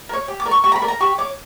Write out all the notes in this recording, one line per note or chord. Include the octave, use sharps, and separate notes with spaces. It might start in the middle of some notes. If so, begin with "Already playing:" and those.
A#4
C#5
G4
D6
A#4 D5
C#6
G4 C#6
A#5
B5
A#4 D5
A#5
G4 C#6
C#5 D6